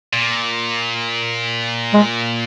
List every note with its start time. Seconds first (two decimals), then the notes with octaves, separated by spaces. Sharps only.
0.13 A#2
1.94 G#3